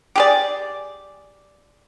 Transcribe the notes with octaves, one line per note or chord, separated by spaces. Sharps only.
G4 G#4 D5